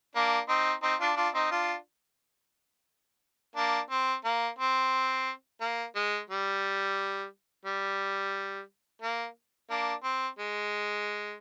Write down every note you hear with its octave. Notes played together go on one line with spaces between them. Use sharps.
A#3 D4
C4 D#4
C4 D#4
D4 F4
D4 F4
C4 D#4
D4 F4
A#3 D4
C4
A#3
C4
A#3
G#3
G3
G3
A#3
A#3 D4
C4
G#3